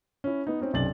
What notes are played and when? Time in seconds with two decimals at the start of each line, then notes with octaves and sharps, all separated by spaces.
0.24 C#4 E4
0.47 B3 D#4
0.60 C4 C#4 D#4
0.73 B1 F#2 C3 D5 A6 F#7